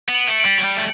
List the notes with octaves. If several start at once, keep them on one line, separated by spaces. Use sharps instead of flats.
B3
D7 F#7
A3
D7 F#7
G3
F#3
G3
A3